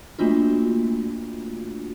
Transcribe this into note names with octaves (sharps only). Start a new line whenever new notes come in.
A3 A#3 D4 F4 F#4